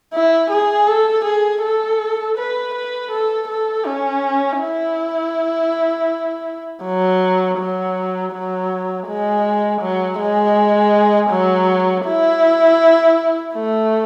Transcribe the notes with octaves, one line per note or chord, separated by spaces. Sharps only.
E4
G#4
A4
G#4
A4
B4
B4
A4
A4
C#4
E4
F#3
F#3
F#3
G#3
F#3
G#3
F#3
E4
A3